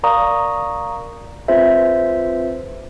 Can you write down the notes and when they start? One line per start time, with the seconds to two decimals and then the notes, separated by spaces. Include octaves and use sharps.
0.03 A#4 D5 F5 A#5 C#6 D#6
1.48 C4 F4 G#4 B4 C5 E5